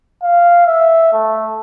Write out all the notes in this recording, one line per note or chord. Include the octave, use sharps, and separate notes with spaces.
F5
E5
A3